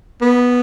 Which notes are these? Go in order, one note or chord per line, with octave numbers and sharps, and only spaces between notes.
B3